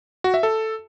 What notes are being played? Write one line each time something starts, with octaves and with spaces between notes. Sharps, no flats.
F#4
E5
A4